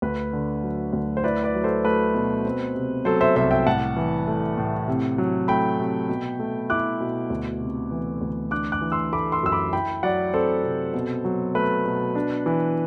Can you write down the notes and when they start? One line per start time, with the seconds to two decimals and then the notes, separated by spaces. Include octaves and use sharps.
0.02 D2 B4
0.33 D3
0.63 F#3
0.93 D2
1.17 C5
1.24 E4 B4 D5
1.44 B4 D5
1.55 F#3
1.64 A4 C5
1.84 A3 B4
2.15 B2
2.45 C4
2.75 C3
3.05 F#3 A4 C5
3.21 C5 E5
3.36 C2 C5 E5
3.51 E5 G5
3.66 A2 F#5 A5
3.97 E3
4.27 A3
4.58 A2
4.88 C3
5.18 F#3
5.48 A3 G5 B5
5.79 C3
6.09 B2
6.39 A3
6.70 E4 D6 F#6
7.00 B2
7.30 D2
7.61 C3
7.91 E3
8.22 D2
8.51 D4 D6 F#6
8.72 D6 F#6
8.81 E3
8.92 C6 E6
9.13 A3 B5 D6
9.32 C6 E6
9.43 F#2 E6
9.52 B5 D6
9.73 E4 G5 B5
10.03 F#3 D5 F#5
10.33 C4 A4 C5
10.64 C3
10.94 B2
11.25 F#3
11.55 A3 B4
11.86 B2
12.15 D4
12.46 E3